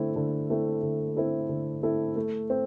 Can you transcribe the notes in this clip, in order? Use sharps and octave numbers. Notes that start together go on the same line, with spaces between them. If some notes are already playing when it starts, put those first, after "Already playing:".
Already playing: D3 A3 C4 E4 A4
D3
A3 C4 E4 A4
D3
A3 C4 E4 A4
D3
A3 C4 E4 A4
A3
C4